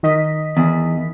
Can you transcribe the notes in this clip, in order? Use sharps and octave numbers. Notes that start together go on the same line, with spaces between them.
D#3 D#5 B6
E2